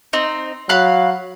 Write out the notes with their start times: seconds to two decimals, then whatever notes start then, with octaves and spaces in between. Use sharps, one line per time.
0.13 C4 D#4
0.69 F#3 F5 B5 F#6